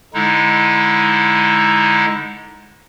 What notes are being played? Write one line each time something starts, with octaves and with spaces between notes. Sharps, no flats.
D3 G#3 D#4 E4